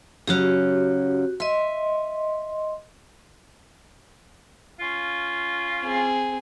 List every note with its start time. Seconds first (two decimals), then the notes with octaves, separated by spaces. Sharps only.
0.27 C#3 F#3 C#4 F#4 G4
1.40 D#5 E5 C6
4.80 C#4 F4
5.83 C4 G#4